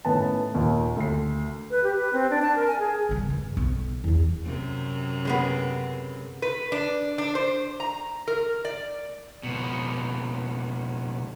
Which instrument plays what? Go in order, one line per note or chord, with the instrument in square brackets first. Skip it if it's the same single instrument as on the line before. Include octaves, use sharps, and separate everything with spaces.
[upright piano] A2 D#3 B3 C#4 A5
D#2 A#2 D#3
D2 C7
[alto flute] B4
G4
B4
C4
D4
A5
A#4
G#5
G#4
[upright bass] C#3 G3
G2
B1
E2 E3
[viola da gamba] F#2 C3
[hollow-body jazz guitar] C#3 G#3 B3
[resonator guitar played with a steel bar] B4
D4
D4
C5
A#5
A#4
D5
[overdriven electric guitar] C#2 B2